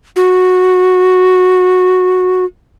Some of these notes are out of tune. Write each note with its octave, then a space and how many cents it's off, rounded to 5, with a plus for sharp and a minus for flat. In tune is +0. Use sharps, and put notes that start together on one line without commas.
F#4 -10